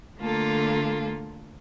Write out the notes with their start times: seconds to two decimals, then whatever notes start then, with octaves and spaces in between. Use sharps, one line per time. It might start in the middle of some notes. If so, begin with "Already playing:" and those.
0.21 D3 A3 A#3 F4 A4